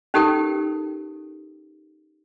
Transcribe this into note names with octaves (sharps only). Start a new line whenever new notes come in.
C#4 D#4 G4 A4 A#4 G5